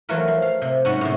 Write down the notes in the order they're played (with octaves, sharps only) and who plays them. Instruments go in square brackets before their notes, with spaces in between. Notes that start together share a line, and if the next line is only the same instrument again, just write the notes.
[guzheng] E3 F#3 A3 F4 A#4 B4
F3
F5
C3
G#2 F#3 C#4 F#4 F#5 B5
A2 C3